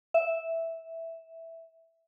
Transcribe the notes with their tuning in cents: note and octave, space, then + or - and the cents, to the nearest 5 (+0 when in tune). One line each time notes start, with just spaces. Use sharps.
E5 -5